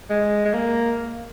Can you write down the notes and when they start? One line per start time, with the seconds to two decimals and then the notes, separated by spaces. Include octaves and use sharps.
0.10 G#3
0.45 G#3
0.54 A#3